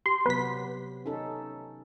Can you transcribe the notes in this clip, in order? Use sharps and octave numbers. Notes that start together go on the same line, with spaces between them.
G4 C6
C3 F#3 B3 B4 B6
C#4 D#4 A4